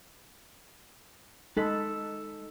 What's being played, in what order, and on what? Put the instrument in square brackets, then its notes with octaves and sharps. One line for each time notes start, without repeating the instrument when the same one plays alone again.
[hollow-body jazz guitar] G#3 B5 [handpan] D#4 A4